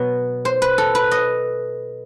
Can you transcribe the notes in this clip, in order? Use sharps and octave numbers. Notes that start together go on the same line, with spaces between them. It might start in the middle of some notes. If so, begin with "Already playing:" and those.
Already playing: B2 F#3 B3
C5
B4
A4
B4
D#5